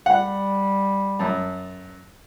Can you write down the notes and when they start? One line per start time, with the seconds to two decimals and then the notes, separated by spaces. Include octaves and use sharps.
0.06 G3 F#5
1.19 F#2 A5